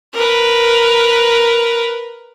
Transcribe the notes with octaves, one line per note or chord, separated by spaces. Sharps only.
A#4 B4